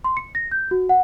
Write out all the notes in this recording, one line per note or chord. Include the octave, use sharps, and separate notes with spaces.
C6
C#7
A#6
G6
F#4
F#5